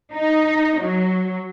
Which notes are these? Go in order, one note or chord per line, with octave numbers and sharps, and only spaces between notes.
D#4
F#3